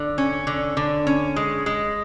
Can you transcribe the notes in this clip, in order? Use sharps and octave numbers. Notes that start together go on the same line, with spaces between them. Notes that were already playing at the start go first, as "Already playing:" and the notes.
Already playing: D3
C#4
D3
D3
C#4
G#3
G#3